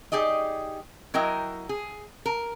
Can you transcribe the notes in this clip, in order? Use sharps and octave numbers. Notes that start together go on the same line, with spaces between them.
D#4 G4 G#4 D5 D#5
F#3 E4 A#4 D#5 G5
G#4
A#4